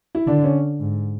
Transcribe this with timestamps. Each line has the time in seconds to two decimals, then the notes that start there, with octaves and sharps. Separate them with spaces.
0.15 E4
0.27 D3 D4
0.44 C#4
0.80 G#2